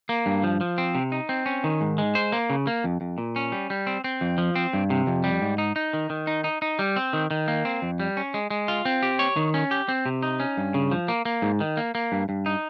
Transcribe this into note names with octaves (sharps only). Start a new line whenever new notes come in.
A#3
G2
F3
F3
C4
C3
D#4
C4
C#4
D#3
G#2
G#3
C5
A#3
C#3
A#3
F2
F2
A#2
C#4
G3
G3
C4
C4
F2
F3
C4
G2
C3
F2
G3
G#2
D#4
D#4
D#3
D#3
D#4
D#4
D#4
G3
C4
D#3
D#3
A#3
C4
F2
G3
C#4
G#3
G#3
F4
C4
G4
C#5
D#3
C#4
G4
C4
C3
D#4
C#4
G2
C#3
F3
A#3
A#3
G#2
D#3
A#3
A#3
G2
G2
D#4